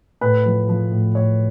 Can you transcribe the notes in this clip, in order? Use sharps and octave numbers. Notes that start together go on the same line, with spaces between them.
A2 B4
F3
F3
A2
A2 C#5